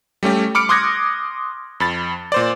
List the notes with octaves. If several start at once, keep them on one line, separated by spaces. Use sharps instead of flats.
G3 A3 C#4 G4
B5 D6 F6 C#7 D7
C6 D6 D#6 F#6 G#6 A#6
F2 B5 A6
A#2 C5 D5